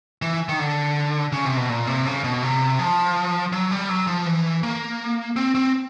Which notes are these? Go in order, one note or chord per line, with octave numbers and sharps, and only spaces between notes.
E3
D#3
D3
C#3
C3
B2
A#2
C3
C#3
B2
C3
F3
F#3
G3
F#3
F3
E3
A#3
C4
C4